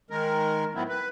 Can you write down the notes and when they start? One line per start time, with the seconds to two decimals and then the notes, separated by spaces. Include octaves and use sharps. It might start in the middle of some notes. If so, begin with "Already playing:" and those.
0.10 D#3 G#3 A#4
0.75 A2 F#3 B3 C4 E4
0.89 B4